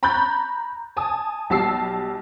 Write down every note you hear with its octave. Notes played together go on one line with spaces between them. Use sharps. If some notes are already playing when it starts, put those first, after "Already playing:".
A#5 B5 C#6 F#6 G6 A6
G#5 A5 D#6
B1 G3 A5 E6 C7